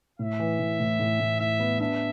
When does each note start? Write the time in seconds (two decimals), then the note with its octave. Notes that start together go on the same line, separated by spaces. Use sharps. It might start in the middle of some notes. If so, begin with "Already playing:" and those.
0.19 A2 E5
0.40 E3
0.59 A2
0.80 A2
1.00 A2
1.20 A2
1.40 A2 E5
1.60 B3
1.80 D4 E5